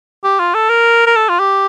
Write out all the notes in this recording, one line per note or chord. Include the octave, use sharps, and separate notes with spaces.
G4
F4
A4
A#4
A#4
A4
F4
G4